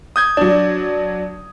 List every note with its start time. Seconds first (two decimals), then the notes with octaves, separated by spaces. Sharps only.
0.16 D#6 G6 G#6
0.37 F#3 D4 D5